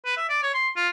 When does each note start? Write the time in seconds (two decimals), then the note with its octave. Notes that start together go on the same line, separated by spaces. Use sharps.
0.05 B4
0.17 E5
0.29 D5
0.43 C#5
0.54 C6
0.76 F4